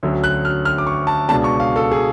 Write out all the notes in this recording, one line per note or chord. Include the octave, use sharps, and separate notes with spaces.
D2 D3 F#3 C#4
F#6
F6
F6
D6
C#6
A5
C#2 B2 G#3 D4 A5
C#6
F5
A4
G#4